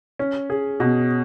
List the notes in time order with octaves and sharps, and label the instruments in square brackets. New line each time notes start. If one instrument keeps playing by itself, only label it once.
[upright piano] C#4
G#4
B2